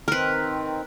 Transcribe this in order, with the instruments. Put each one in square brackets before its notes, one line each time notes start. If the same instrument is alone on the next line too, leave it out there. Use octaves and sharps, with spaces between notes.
[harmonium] D#3 C4 [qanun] A#4 B4